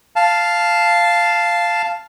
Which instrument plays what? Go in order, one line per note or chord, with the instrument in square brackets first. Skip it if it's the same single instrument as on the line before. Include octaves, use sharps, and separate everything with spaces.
[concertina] F5 A5